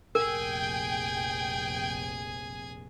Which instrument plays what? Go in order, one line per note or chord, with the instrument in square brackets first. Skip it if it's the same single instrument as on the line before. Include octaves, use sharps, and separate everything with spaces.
[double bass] F1 A#1 [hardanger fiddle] G#4 G#5 [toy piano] A#4 [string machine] G5